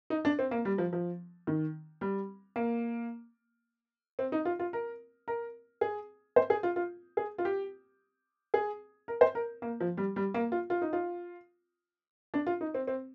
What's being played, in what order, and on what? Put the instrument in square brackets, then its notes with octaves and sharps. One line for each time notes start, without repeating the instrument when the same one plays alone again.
[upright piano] D#4
D4
C4
A#3
G3
F3
F3
D#3
G3
A#3
C4
D#4
F4
F4
A#4
A#4
G#4
C5
G#4
F4
F4
G#4
F4
G4
G#4
A#4
C5
A#4
A#3
F3
G3
G3
A#3
F4
F4
D#4
F4
D4
F4
D#4
C4
C4